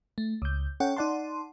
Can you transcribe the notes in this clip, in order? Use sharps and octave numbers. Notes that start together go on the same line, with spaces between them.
A3
C#2 G6
C#4 A4 C#5 F#5 G5
D#4 D5 F#5 A5 C6